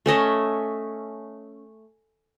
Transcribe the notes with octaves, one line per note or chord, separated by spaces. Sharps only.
A3 C#4 D#5 E5